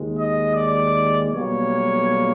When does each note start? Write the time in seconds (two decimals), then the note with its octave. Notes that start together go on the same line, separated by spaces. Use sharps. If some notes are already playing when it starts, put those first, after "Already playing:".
Already playing: D#2 D#3 G#3
0.16 D#5
0.54 D5
1.31 B1 B2 G3 A#3 C#5